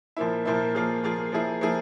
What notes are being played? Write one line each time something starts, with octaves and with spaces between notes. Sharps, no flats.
A#2 F3 A#3 E4
A#2 F3 A#3 E4
F3 A#3 F4 G#4
F3 A#3 F4 G#4
F3 A#3 E4 G#4
F3 A#3 E4 G#4